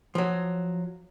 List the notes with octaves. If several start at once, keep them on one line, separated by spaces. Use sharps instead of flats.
F3 F#3